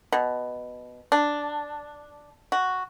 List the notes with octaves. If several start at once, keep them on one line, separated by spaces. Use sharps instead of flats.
B2
D4
F#4